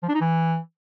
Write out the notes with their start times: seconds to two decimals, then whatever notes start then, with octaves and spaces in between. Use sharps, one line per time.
0.03 F3
0.09 D4
0.15 D#4
0.21 E3